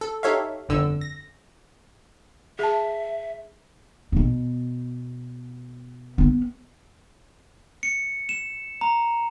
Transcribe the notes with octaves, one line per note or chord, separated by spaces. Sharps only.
A4
D#4 G4 A4 C#5 E5 F5
G1 F2 D3 E6
A#6
G#4 E5 A5
B2 B3
B3 C#4
C#7
E7
A#5